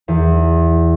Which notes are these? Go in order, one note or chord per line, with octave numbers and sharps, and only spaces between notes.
E2